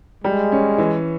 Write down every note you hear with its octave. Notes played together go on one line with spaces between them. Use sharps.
G3 G#3
C#4
E3